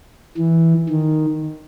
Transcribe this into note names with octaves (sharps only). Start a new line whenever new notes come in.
E3
D#3